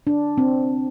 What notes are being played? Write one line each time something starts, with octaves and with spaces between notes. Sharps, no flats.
D4
C4